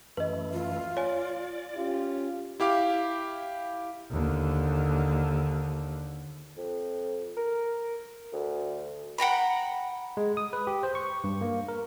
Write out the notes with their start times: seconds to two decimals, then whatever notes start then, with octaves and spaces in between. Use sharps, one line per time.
0.17 F#2 E3 A3 B4 D#5
0.53 F4
0.97 C#5 D5 G#5
1.75 C#4 F4 G4
2.60 E4 G4 F5 D6
4.11 D#2 D3
6.57 F2
7.37 A#4
8.32 D2
9.18 F#5 G5 A#5 B5
10.17 G#3
10.37 D#6
10.53 B4
10.67 G4
10.83 C5
10.95 C#6
11.24 G2
11.41 A#3
11.68 A#4